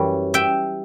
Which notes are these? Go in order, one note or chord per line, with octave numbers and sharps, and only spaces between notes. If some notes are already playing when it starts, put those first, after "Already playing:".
Already playing: F#2 E3 G3
E5 G5